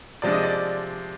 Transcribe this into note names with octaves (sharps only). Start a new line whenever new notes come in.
C3 F3 G#3 D4 D5
D#5
D5